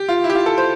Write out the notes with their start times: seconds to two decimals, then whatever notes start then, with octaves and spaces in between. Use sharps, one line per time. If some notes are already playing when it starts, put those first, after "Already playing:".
Already playing: G4
0.09 F4
0.24 E4
0.30 G4
0.35 F4
0.46 A4
0.58 C5